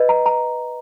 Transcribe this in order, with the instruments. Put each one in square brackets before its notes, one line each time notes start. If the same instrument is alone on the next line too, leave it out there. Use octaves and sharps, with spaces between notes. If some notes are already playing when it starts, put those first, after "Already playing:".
Already playing: [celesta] B4 D#5
A#5
A#5